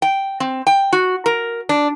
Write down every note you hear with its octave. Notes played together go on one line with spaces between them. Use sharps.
G5
C4
G5
F#4
A#4
D4